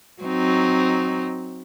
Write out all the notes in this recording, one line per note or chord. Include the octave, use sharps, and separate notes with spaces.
F#3 C4 D#4